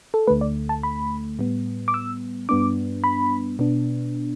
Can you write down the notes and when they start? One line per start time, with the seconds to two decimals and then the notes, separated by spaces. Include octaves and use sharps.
0.14 A4
0.27 D2 D3 A3 B4
0.41 D5
0.69 A5
0.83 B5
1.39 A2 G3 B3
1.88 D6
1.94 E6
2.49 G2 G3 B3 D4 D6
3.04 B5
3.59 B2 B3 D4